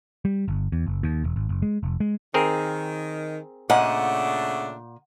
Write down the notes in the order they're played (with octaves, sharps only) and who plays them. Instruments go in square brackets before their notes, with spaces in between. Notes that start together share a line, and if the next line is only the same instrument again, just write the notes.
[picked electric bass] G3
G1
E2
F#1
D#2
E1
G#1
F#1
G#3
F1
G#3
[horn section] D#3 [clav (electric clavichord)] C4 G#4 A#4
[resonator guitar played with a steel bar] A#2 D#5 G#5 [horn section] C#3 A3 D4 [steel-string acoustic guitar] F#5